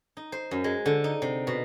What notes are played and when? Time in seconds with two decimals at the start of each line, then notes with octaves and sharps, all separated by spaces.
0.17 D#4
0.32 C5
0.51 F#2
0.64 G#3
0.86 D3
1.04 D#4
1.22 C3
1.47 B2